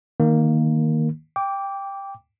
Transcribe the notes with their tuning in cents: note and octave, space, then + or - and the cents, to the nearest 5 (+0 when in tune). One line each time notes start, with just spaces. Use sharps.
D#3 +0 A#3 +0
G5 +10 D6 -15